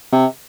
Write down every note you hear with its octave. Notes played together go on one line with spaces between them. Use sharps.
C3